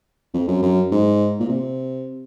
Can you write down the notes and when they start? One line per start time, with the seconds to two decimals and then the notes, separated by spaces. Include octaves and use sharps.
0.34 F2
0.48 F#2
0.62 F#2
0.92 G#2
1.40 A#2
1.49 C3